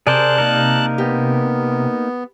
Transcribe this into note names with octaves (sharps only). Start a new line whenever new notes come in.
C3 G#4 A#4 C5 D5 A5 F#6
A#3 D#4 A#4
B3 G4